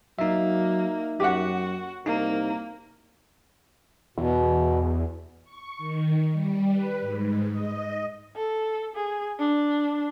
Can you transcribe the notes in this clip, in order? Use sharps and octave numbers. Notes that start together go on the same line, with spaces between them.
F#3 A#3 D#4 E5
F#2 F#4 G4 F#5
C2 A#3 D#4
E2 B2
C#6
D#3
G3
B4
G#2
D#5
A4
G#4
D4